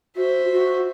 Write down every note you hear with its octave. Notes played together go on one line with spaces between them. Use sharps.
F#4 C5 E5
F#4